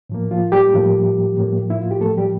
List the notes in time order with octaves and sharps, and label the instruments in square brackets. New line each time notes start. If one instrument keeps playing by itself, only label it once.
[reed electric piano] A2 F3 A#3
F3 F4
G3 G4
A2 F3 A#3
A2 F3 A#3
E4
F4
G4
A2 F3 A3 A#3 A4
G3 G4